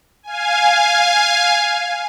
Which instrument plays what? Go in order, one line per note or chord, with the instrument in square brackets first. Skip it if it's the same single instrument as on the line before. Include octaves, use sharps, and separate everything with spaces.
[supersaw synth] F5 G#5